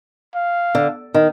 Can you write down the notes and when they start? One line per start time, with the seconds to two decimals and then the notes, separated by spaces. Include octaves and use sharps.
0.35 F5
0.75 D3
1.14 D#3